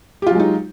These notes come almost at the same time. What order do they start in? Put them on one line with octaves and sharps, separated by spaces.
G4 F4 F#3 G#3 D#4